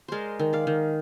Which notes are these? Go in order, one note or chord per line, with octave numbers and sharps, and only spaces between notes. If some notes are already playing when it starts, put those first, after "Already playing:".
G#3 A#4 C5 D5
D#3
D5 F5
D#3